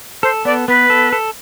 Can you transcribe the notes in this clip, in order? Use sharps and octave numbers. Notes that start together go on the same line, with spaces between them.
A4 C5
B3 D5
B3 B4
A4
A4